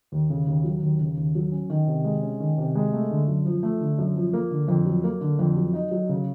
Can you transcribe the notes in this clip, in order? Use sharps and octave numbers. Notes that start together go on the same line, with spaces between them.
D#2
C#3
D#2
F#3
D#2
C#3
D#2
F#3
C#4
D#3
C3
G#3
C#4
D#3
C3
G#3
A3
D3
F#2
F3
A3
D3
F#2
F3
A#3
D3
F2
F#3
A#3
D3
F2
F#3
D#4
F#3
C#3